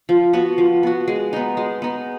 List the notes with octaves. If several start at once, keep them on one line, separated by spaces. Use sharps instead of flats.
F3
B3 F#4
F3
B3 F#4
G#3
B3 D#4
G#3
B3 D#4